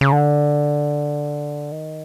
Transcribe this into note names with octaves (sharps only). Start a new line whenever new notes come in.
C#3
D3
D#3